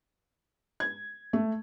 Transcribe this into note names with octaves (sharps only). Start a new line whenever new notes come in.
G#6
A3